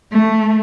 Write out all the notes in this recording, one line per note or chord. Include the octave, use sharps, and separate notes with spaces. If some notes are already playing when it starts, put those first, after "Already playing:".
A3